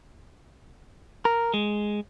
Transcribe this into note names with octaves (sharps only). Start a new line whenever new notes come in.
A#4
G#3